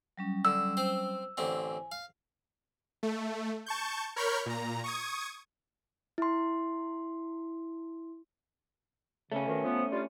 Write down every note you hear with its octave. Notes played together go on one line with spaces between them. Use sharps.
F#3 G3 C#4
D3 E6
C4 C5
A1 D3 C4 G#5
F5
A3
A5 C#6 G6
A#4 C#5 B5 C#6 F6 G6
A#2 A#5
C#6 D#6 G#6
E4 C6
C#3 A3 C#4
F2 B2 D#3
F3 B3
G3 D4 F4